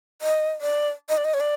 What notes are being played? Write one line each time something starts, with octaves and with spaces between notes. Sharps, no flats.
D#5
D5
D#5
D5
D#5
C#5
D5